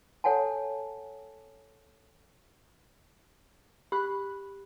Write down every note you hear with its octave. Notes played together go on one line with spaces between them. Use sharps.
A4 C#5 F#5 G#5 A5
G4 B5 F#6